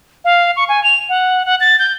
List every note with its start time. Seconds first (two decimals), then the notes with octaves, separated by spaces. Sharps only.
0.25 F5
0.56 C#6
0.69 G#5
0.84 F7
1.09 F#5
1.46 F#5
1.60 A6
1.79 G6